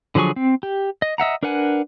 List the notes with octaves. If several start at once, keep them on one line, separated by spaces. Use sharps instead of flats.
D3 F3 F#3 G#4 C#6
C4
G4
D#5
D#5 E5 F#5 A#5
D4 A#4 B4 F#5 G#5